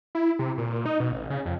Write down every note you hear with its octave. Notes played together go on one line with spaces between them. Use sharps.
E4
C3
A#2
A#2
D#4
B2
A1
C#3
F2